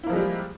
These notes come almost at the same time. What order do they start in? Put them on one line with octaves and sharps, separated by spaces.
E4 A#3 F3 G#3 G3